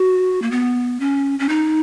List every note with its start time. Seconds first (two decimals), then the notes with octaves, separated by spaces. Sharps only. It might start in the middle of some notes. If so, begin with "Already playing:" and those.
Already playing: F#4
0.42 A#3
0.51 B3
1.00 C#4
1.39 C#4
1.49 D#4